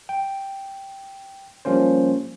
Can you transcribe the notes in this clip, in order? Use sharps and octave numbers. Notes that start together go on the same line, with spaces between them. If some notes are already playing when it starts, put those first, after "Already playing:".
G5
F3 G3 A#3 C#4 C5